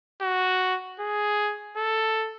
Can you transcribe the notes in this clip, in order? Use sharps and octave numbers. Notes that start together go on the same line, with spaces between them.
F#4
G#4
A4